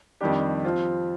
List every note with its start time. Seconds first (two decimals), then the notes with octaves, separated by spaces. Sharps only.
0.21 F2 D#3 G3 D4 G4
0.65 F3 C4 F4